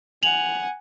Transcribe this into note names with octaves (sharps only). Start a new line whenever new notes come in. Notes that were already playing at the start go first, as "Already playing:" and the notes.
F#5 G#5 F7 F#7